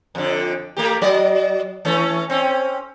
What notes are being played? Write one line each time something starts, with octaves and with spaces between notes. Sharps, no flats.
F2 D3
A3 A#3 G4
F#3 D5 D#5
E3 A3 C#4
C4 C#4